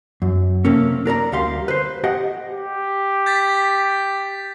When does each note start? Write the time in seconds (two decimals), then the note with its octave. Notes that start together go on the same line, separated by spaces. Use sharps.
0.22 F#2
0.65 C3 A3 A#3 C4 C#4
1.06 D4 A#4 D5 A#5
1.32 D2 G3 F5 C6
1.68 B4 C5
2.04 G4 D#5 F#5
2.48 G4
3.26 G6 A6 B6